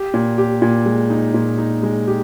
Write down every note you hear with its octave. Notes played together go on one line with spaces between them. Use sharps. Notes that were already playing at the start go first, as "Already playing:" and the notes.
Already playing: G4
A#2
G4
A#2
G#3
D#4
A#2
D#4
G#3
G4